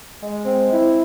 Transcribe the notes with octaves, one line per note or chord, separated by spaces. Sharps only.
G#3
C4
E4